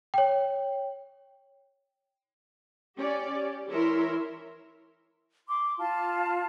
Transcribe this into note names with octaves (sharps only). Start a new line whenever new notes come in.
C#5 G5
C#4 G4 D5
G4
E3 E4 A#4 C#5 E5 C6
C6 D6
F4 A5